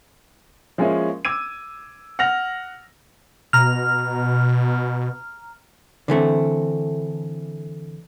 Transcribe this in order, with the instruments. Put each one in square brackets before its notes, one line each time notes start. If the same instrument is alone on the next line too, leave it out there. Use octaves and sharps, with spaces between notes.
[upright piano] F3 G#3 A#3 C#4 E4
D6 E6 G#6 D#7
F#5 F6 A#6 F7
[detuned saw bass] B2 [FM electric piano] A#5 F6
[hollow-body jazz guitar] D3 E3 A3 C4